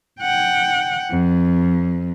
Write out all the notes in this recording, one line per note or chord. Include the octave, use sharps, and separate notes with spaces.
F#5 G5
F2